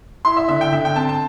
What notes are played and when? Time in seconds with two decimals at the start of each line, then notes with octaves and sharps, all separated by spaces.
0.25 E4 C6
0.37 E5
0.49 D3 E5
0.61 G5
0.72 D3 E5
0.85 G5
0.96 C4 A5
1.09 A5